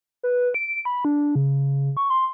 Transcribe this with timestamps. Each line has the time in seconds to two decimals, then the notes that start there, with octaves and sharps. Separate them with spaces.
0.23 B4
0.54 D7
0.85 B5
1.05 D4
1.35 C#3
1.97 C#6
2.10 C6